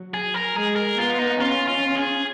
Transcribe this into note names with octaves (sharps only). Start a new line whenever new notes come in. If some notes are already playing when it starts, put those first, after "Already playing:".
Already playing: F#3
G#4
A#4
G#3 G#4
A#4
B3 F4
D#4
C#4 F4
F4
G#4